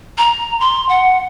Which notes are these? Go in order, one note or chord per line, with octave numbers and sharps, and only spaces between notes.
A#5
C6
F#5